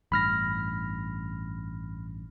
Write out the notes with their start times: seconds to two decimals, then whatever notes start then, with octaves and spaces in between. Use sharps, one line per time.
0.12 A1 G2 B5 F6 A#6